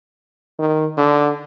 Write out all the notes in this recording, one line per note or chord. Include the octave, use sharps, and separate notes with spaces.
D#3
D3